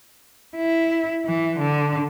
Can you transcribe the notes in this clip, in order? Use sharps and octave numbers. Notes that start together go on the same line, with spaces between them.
E4
E3
D3